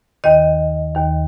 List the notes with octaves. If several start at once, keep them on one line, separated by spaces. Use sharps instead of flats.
D#2 D#3 D#5
D#2 D#3